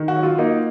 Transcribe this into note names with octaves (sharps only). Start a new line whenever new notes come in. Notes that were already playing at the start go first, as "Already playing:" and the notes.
Already playing: D#3
F#4
F#3
F4
A#3 D#4